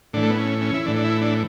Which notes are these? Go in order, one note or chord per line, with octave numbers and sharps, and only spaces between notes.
A2 E3 D4
A3
B3
C#4
C#4
E4
A2 E3 D4
D4
E4
D4